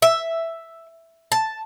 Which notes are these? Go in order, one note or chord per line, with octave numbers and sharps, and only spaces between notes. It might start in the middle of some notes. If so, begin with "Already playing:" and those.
E5
A5